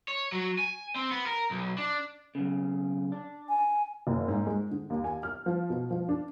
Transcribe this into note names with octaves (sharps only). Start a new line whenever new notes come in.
C#5
F#3
G#5
C4
B3
A#4
B1
D4
B1 C#3
D4
G#5
F#1
G#2
G#3
D3
D#2
G#5
F6
F3
B2
F3
D4